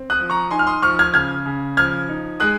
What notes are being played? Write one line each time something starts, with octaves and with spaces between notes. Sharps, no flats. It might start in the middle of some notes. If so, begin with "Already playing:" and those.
Already playing: C4
D#6 F#6
F3
A#5 C#6
D#4 G#5 C6
F6
C6 D#6
F3 C#6 F6
F6 G#6
C#3 F6 G#6
C#3
F3 F6 G#6
D#4
G#3 D#6 F#6